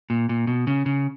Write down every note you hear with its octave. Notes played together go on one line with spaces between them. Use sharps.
A#2
A#2
B2
C#3
C#3